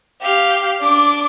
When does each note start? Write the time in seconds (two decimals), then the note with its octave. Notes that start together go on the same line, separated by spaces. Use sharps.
0.21 G4 F5
0.81 D4 D6